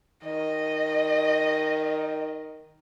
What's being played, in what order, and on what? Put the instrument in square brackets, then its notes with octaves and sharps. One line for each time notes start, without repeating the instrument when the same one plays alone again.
[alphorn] D#3 [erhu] D#5